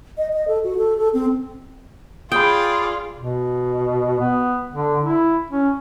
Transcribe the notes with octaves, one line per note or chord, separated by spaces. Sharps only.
D#5
D#5
A4
F#4
A4
A4
C4
F4 G#4 D5 G5 B5 D#6
B2
B3
D3
E4
C#4